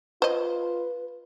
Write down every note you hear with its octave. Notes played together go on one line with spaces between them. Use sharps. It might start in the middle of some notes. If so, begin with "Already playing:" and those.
F4 B4 C5 D#5